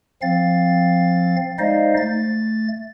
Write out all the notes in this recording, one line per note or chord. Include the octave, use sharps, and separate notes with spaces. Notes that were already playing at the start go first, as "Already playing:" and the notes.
F3 C4 F5 A6
G#3 D#4 C5 D5 D#5 F5
A3 A6